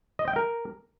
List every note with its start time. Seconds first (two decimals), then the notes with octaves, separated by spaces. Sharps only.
0.19 D#5
0.28 G5
0.36 A#4